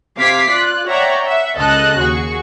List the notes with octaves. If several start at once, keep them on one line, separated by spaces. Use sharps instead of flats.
C3 F5 D6 G#6 B6 C7
F4 D5 F#6
C#5 D5 E5 F#5 G5 A#5
E5 F#5
C#2 C#3 A4 D#5 A5 F#6
D#2 F#4 G#4 C#6